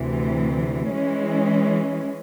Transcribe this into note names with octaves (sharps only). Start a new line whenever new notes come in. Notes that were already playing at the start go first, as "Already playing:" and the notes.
Already playing: D2 C3 E3
E3 G#3 C#4